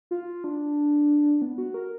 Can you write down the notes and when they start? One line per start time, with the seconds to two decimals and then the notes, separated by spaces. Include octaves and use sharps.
0.11 F4
0.44 D4
1.42 B3
1.58 F#4
1.74 A#4